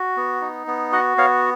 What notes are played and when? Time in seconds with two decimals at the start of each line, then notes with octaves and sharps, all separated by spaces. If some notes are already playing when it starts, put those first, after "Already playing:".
Already playing: F#4
0.17 B3
0.41 D#4
0.67 B3
0.92 F#4 D#5 F#5
1.17 B3 C#5 F5